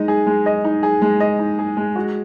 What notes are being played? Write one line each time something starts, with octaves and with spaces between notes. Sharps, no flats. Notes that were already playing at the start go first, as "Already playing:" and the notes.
Already playing: G#3 D#4 D#5
G#4
G#3
D#5
D#4
G#4
G#3
D#5
D#4
G#4
G#3
F#4